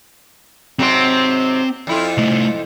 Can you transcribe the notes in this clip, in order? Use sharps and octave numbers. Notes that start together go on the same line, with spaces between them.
G#2 C3 F#3 C4 C6
F2 E4 F4
C2 A3